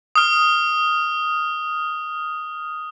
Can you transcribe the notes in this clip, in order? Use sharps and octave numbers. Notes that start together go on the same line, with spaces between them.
D#6 F6